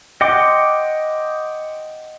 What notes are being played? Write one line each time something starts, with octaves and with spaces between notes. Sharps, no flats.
D#5 F#5 G5 C6 D6